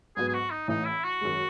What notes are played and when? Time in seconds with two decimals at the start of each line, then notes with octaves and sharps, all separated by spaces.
0.16 G#2 F#3 B3 G#4
0.28 G#4
0.34 F#4
0.51 D#4
0.68 A1 A2 E3 D#4
0.86 E4
1.04 F#4
1.21 F#2 D#3 G#3